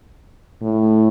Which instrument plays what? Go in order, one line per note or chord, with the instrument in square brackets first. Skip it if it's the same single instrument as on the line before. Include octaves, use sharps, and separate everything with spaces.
[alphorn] A2